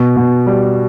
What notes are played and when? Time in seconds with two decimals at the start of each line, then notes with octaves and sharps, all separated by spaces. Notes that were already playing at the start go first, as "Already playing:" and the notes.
Already playing: B2
0.16 B2
0.47 G3